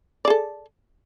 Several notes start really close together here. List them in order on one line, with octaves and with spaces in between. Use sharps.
D5 G#4 A4